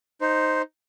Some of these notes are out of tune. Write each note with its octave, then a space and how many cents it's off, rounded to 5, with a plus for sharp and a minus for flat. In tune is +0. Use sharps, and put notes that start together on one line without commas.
D#4 +0 C5 +0